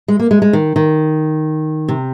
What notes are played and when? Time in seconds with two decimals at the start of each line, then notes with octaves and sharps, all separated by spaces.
0.08 G#3
0.20 A#3
0.31 G#3
0.42 G#3
0.53 D#3
0.76 D#3
1.88 C3